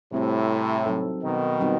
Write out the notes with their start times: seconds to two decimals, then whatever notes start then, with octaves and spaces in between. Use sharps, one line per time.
0.12 A2 C3 G3 C4 F#4 A4
0.86 F#3 C4 D#4 A4
1.23 B2 D#3
1.60 G3 C4 D#4